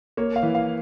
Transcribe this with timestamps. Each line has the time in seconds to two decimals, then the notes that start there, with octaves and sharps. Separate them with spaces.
0.17 A#3 C#5
0.36 F5
0.43 E3
0.55 F5